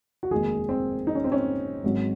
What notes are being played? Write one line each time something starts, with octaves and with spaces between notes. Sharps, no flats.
F#4
F1 D#2 D#3 G#3 G#4
C4
D#4
C#4
C4
C#4
G#1 G#2 F#3